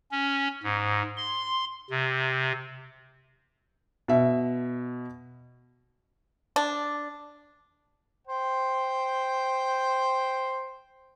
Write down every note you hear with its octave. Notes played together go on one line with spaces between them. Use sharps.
C#4
G#2
C6
C3
B2 E5
D4
C5 G5